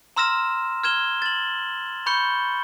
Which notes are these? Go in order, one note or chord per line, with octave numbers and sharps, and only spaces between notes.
A#5 C6 E6 F6 A#6 E7
F6 G#6 E7 G7
A6 F#7
B5 C#6 G6 C#7 G7